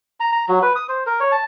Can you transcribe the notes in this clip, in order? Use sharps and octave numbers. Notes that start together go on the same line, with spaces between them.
A#5
A#5
F#3
B4
D#6
C5
A#4
C#5
A5